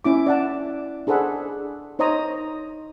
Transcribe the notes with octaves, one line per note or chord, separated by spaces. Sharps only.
C#4 E4 D6
D5 F#5 A5
D4 G#4 A4 C5 F#5 B5
D#4 C5 C#5 D#5 A#5 D#6